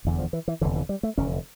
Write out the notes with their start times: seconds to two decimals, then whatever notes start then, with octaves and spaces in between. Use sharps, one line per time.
0.05 F1 E2 D3
0.19 F3
0.33 E3
0.48 E3
0.61 F1 E2 D3 E3
0.75 E3
0.89 G3
1.03 A3
1.18 F1 E2 D3 C#4